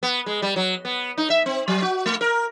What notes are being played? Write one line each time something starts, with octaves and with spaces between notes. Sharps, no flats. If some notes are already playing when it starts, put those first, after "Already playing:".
B3
G#3
G3
F#3
B3
D#4
E5
C4
F#3
F#4
A3
A#4